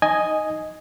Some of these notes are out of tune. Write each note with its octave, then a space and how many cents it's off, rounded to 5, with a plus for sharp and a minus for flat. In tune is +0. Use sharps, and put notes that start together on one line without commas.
D#4 +0 D#5 +0 G#5 +0